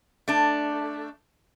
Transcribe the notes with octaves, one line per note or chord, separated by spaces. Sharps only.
A3 D4